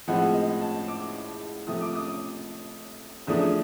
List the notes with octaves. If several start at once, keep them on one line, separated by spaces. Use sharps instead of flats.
A2 F3 G#3 C4 F#5
D#5
A5
D6
C3 F3 A3 D#6
D6
D#6
E2 C#3 F3 A3 D4 D#6